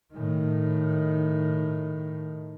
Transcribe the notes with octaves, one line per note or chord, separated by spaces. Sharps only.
A2 D#3